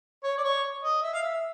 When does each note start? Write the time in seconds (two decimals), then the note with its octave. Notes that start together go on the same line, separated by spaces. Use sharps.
0.24 C#5
0.38 D5
0.44 C#5
0.83 D#5
1.02 E5
1.14 F5
1.22 E5